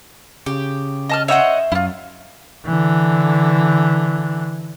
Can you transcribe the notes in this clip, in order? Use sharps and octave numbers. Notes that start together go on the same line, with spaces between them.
C#3 G4
D#5 A5 F6
C5 C#5 D#5 E5 F#5
F#2 E4 F4
D3 E3